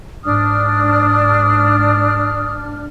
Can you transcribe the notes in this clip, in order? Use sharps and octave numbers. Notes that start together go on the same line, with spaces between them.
G#2 D4 D#6 F6